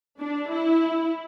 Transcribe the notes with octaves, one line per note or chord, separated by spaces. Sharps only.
D4
E4